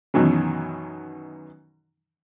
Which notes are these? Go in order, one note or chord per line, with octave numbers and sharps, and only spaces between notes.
F#2 B2 D#3 E3 F#3